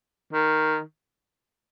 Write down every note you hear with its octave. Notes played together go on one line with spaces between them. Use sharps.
D#3